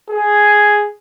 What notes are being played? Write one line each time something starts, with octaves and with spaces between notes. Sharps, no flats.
G#4